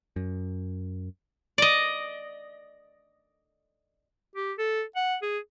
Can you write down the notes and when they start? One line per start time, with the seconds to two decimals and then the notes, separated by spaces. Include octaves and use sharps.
0.16 F#2
1.58 D5 D#5
4.35 G4
4.58 A4
4.96 F#5
5.23 G#4